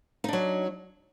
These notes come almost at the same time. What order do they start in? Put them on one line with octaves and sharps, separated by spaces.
D#4 D4 F#3